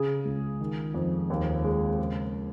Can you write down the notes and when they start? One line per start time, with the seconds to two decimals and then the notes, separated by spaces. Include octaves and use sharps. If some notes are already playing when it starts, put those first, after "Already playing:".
Already playing: C#3 G#4
0.25 C#2
0.60 D#3
0.94 F2
1.30 D#2
1.64 G#3
1.99 C#3